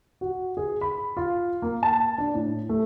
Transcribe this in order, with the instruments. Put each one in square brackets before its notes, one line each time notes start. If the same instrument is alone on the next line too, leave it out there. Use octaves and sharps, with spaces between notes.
[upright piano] F#4
G#4
B5
F4
A#3
A5
D4
A2
A3